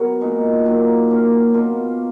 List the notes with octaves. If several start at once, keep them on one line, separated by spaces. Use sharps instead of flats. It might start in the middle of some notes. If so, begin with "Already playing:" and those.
Already playing: F#3 B3 F#4 A#4
A#2 G#3 D#4
D#3 F#3 A#3
F#3 A#3 C#4
B2 A#3 F4